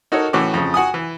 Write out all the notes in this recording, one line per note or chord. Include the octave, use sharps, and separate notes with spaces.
D#4 F#4 A4 A#4 C#5
A2 E3 C#4 F#4 D6
F2 C#3
F#4 F#5 G#5 D#6
E3